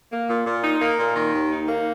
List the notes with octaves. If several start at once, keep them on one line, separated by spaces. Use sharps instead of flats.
A#3
A#2
A#2
D#4
A#3
A#2
D#3
D#2
D#4
A#3